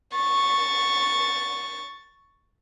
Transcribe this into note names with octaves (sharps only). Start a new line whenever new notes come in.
C#6 A6